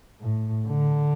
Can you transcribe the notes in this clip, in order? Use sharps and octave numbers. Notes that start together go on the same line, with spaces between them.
A2
D3